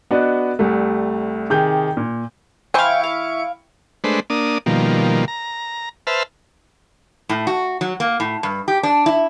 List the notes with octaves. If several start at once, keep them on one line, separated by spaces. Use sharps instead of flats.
B3 D4 F#4 D#5
C2 G3 A3
C3 D#3 G4 G#4 G6
A#2
E3 E4 C5 F5 G5 G#5 C#6 D7
F5
G#3 A3 D4 B4 C5
A#3 D4 D#6
B2 D#3 F3 G3 A#3
A#5
B4 C5 E5 A5 F6
A2
F#4
F#3
A#3
A2
G2
G4
D4
E4